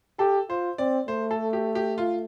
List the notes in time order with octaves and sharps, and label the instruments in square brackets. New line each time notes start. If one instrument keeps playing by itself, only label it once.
[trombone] G4 [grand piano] A4
[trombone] F4 [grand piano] C5
[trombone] C4 [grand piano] D5
[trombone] A3 [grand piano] C5
[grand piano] A4
G4
G4
F4